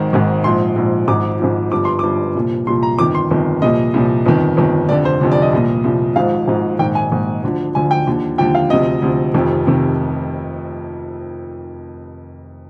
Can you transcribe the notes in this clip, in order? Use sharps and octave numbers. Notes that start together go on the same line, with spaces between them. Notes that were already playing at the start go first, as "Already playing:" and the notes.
Already playing: G#1 G#2 D#3
G#1 G#2 D#3
A#1 G#2 F3 C6
A#1 G#2 F3
G#1 G#2 F3 D6
G#1 G#2 F3
G1 G2 F3 D6
C6
G1 G2 F3 D6
C2 A#2 F3
C2 A#2 F3 C6
A#5
G1 F2 D#3 D6
C6
G1 F2 D#3
C2 A#2 F3 D#5
C2 A#2 F3
G1 F2 D#3
G1 F2 D#3
F1 F2 D3 D5
C5
F1 F2 D3
D5
D#5
C2 A#2 F3
C2 A#2 F3
G#1 G#2 F3 F5
G#1 G#2 F3
A#1 G#2 D#3 G5
G#5
A#1 G#2 D#3
D2 D3 F3
D2 D3 F3 G#5
G5
D#2 D3 F3
D#2 D3 F3 G5
F5
D2 C3 F3 D#5
D2 C3 F3
F1 F2 C3 D#3
C3 D#3